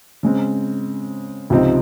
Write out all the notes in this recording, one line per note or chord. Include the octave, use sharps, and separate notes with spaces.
C#3 G#3 C4
C#2 C3 F3 C4 D#4